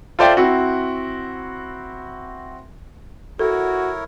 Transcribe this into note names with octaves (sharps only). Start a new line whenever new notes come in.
F4 A4 C5 D5 E5 G5
C4 E4 F#4
E4 F#4 A4 A#4 C#5